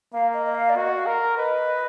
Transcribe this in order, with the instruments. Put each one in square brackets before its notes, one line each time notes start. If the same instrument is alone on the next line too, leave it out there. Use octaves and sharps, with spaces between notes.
[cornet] A#3 [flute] F5
[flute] D#5
D#5
F5
D5
[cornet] F#4 [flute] D#5
[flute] F5
[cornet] A#4
[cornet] B4 [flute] D#5